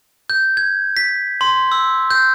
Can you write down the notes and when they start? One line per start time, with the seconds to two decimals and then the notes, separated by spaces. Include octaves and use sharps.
0.30 G6
0.57 G#6
0.96 B6
1.41 C6
1.72 E6
2.10 G6